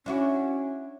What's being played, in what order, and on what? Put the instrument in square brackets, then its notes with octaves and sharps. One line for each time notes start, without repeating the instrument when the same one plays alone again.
[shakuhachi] C#4 [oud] D4 E4 F#4